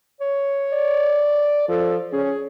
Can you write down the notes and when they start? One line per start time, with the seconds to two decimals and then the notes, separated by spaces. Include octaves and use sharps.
0.21 C#5
0.73 D5
1.68 F3 A4
2.12 C#4 G#4